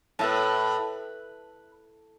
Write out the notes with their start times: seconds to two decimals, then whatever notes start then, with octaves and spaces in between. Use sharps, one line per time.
0.19 A2 B4 E5 A5